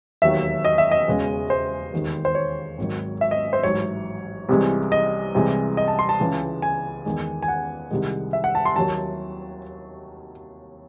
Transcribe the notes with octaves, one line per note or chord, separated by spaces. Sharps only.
E1 D#2 D#3 F#3 E5
D#5
E5
D#5
E1 E2 C#3 G#3
C5
E1 D#2 D#3
C5
C#5
G#1 G#2 D#3 F#3
E5
D#5
C5
A1 G#2 F#3 C#5
C2 C3 E3 G#3
D#5
C2 C3 E3 G#3
D#5
A5
C6
A5
C#2 C#3 E3 G#3
G#5
E2 D#3 G#3
G#5
F#5
C2 C3 D#3 G#3
E5
F#5
A5
C6
D#2 D#3 F#3 A5